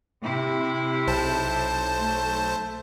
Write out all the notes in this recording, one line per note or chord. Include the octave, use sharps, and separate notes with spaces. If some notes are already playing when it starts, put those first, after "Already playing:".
C3 E4
B1 C5 A5
A3